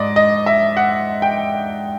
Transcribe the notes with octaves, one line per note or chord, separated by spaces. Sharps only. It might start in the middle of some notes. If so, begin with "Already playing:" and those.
Already playing: G#2 D5 D#5
D#5
E5
F#5
G5